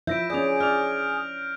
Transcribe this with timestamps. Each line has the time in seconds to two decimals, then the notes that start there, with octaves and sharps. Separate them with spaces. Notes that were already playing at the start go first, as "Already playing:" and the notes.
0.07 F3 E4 E5 G6 A#6 D7
0.30 C#4 G#4 D5 G6 F7
0.60 D5 F6 F7